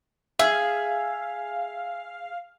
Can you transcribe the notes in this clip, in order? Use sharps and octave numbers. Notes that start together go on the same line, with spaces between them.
G#4 E5 F5